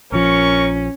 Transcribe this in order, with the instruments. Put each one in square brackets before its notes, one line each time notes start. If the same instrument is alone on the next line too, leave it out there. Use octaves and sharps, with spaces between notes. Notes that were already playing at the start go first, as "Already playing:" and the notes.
[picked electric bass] A#1 F3 [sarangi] C#4 [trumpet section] A#4 C#6